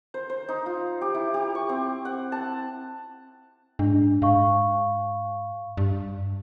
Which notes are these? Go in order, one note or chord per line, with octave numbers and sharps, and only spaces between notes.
C5
C5
D#4
F4
G4
E4
G4
C#6
C4
F#5
A5
G#2 D4
G#2 F5 C#6
G2